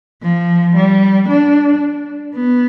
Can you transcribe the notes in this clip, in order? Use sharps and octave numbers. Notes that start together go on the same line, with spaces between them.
F3
G3
D4
B3